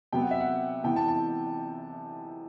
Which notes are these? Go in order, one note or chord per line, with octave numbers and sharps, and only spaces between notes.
C3 F#3 B3 G5
F#5
E5
F#5
C3 E3 B3 G5
A5
A5